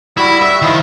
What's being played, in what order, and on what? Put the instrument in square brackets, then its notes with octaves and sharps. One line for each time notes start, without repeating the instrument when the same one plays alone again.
[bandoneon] G3 F#4 [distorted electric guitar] E4
[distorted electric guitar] E5
[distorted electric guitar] D#3 [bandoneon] F3 E4